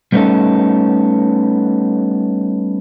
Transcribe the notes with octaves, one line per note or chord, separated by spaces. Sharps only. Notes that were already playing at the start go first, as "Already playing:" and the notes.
G3 A3 B3 C#4 D#4 A4